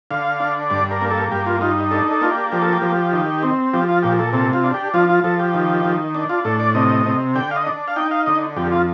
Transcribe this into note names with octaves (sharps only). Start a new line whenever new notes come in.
D3 F5
D4
G2 D5
A#4
A#3
A4
G2 G4
F4
D#4 F4
D4 A4
A4
A#3 F4
G4
F3 G4
A4
G4
F3
D#3
C4
F3 G4
F4
A#2 G4
A4
C3 A4
F4
D4
G4
F3 F4
F4
F3 A4
G4
D#3
D#3
D4
F4
A2 A4
D5
C3 D#5
C3
D3 G5
F5
D#5
D4
F5
D#4 G5
F5
D3 D#5
F2 G4
F4